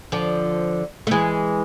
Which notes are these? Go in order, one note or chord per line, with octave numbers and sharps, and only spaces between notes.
D3 F3
A3
E3 G#3